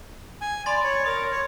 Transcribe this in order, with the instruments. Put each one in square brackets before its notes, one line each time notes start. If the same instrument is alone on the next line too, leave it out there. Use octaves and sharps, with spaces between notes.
[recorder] G#5
[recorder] D5 [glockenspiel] B5 C6 A6
[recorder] C#5
[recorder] A#4 [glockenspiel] D#6
[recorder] C#5